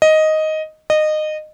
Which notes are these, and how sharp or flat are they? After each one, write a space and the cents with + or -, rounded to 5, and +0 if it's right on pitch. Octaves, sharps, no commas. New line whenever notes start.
D#5 +5
D#5 -20